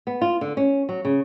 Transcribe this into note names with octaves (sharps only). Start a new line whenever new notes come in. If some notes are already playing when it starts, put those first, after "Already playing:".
B3
F4
D3
C#4
F#3
C#3